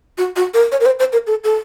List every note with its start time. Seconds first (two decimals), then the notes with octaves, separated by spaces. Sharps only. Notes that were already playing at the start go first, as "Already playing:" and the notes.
0.18 F#4
0.36 F#4
0.54 A#4
0.72 C#5
0.80 A#4
0.86 C5
0.99 C5
1.13 A#4
1.27 A4
1.44 A4